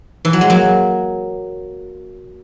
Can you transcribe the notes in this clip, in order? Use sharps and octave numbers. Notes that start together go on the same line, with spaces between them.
E3
F#3
G#3
F#3 A#3